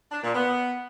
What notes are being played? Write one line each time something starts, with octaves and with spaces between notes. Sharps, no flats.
D4
A#2
B3